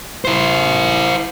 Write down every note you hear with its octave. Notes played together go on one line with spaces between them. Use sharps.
E4 C5